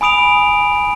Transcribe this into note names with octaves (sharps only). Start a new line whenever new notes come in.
G#5 B5 D#6 D7 F7